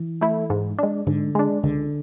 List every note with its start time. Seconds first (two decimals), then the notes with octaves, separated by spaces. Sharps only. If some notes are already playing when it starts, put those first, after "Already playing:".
Already playing: E3
0.21 A3 E4
0.50 G#2
0.79 G#3 D4
1.07 G#2 D3
1.35 G#3 D4
1.63 C#2 D3